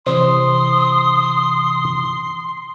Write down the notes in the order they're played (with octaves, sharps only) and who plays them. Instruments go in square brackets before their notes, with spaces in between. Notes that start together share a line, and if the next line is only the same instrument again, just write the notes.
[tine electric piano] C3 E3 [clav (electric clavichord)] C5 [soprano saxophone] C6 [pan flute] D#6